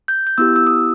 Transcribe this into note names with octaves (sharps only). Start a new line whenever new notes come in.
G6
G6
B3 E4 G4 E6
E6
D#6